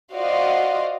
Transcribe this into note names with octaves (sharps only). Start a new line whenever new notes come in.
F4 F#4 C5 D5 D#5 F5